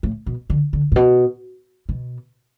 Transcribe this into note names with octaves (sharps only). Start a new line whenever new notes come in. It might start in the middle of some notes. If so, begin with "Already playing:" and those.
A2
B2
D3
D3
A2
B2
B2